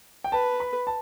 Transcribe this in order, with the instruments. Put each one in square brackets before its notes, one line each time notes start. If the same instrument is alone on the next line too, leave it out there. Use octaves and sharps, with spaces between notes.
[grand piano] G5
[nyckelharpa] B4 [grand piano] A5
[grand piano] B5
A5